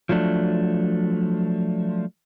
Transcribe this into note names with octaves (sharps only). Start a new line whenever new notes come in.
F3 F#3 A3 D4